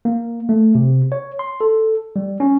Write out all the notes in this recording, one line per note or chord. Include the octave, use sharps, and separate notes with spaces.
A#3
A3
C3
C#5
C6
A4
G3
C#4